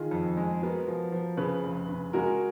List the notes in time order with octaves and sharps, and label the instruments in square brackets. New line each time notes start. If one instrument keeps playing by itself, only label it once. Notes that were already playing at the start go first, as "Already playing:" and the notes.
Already playing: [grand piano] D#3 [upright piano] F4 G#4
[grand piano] F2
G#3
[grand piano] B3 [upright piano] F#4 A#4
[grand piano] F3
F3
[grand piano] C#3 [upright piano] G#4 B4
[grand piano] F1
C#3
[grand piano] G#3 [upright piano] F#4 A#4